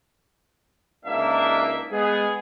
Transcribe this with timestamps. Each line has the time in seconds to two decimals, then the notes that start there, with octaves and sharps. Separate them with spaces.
1.06 C#2 A#3 D4 D#4 E5
1.91 G#3 B3 G#4